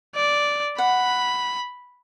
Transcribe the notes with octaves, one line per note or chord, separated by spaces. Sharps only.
D5
F#5 B5